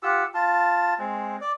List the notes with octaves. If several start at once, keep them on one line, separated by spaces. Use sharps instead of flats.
F4 G4 F#5 E6
F4 A5
G#3 C4
D5